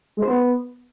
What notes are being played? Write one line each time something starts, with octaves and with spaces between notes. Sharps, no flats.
G#3
C5
B3